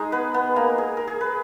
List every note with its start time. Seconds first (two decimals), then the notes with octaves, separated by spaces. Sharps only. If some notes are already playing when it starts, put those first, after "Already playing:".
Already playing: G#3 D#4 G#4
0.12 B3 B4
0.34 B3 B4
0.56 A#3 A#4
0.78 G#4
0.97 A#4
1.07 G#4
1.21 B4